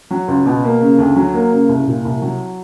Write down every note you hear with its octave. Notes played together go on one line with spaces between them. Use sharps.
F#3
C#2
B2
A#3
C#3
D2
F#3
A#3
C#3
C2
A#2
C2
F#3